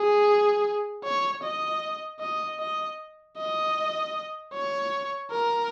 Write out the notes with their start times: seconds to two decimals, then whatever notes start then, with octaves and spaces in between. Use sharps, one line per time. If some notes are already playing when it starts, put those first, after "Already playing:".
Already playing: G#4
1.04 C#5
1.43 D#5
2.20 D#5
2.59 D#5
3.38 D#5
4.53 C#5
5.31 A#4